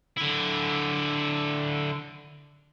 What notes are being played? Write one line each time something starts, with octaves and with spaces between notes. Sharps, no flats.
D3 E4